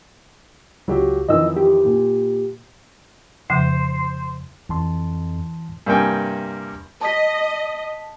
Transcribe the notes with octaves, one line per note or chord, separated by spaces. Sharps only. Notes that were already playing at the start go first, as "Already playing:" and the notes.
C#2 F#3 F4 G4
F2 D#3 E3 D#5 E6
G4
A#2
F2 C#3 F3 C5
F2 E3 A5 C6
G2 C3 A#3 G5 G#5
D#5 A5 B6